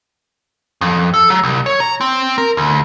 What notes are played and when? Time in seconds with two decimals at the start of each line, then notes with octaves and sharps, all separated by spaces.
0.81 F2
1.14 A4
1.30 F#3
1.43 C2
1.66 C#5
1.80 A#5
2.01 C4
2.38 A#4
2.57 D2